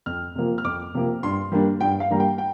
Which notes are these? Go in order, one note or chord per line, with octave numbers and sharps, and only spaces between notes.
F2 F6
C3 F3 A#3
F6
F2 D6
C3 F3 A#3
G2 C6
G3 A#3 D4
G2 G5
F5
G3 A#3 D4 A#5
G5
G5